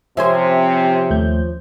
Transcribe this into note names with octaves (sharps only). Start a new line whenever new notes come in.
C3 F3 C#4 C5 E5 G#5 G#6
D#2 A3 G6